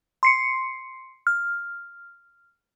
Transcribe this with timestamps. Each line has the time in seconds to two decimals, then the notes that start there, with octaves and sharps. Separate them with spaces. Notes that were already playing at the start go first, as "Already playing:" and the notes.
0.23 C6 C7 C#7
1.27 F6